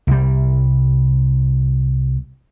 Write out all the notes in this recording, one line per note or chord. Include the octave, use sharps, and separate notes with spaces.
C2 G3